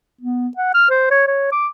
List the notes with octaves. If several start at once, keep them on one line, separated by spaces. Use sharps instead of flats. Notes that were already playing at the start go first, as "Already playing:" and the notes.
B3
F#5
F6
C5
C#5
C#5
D6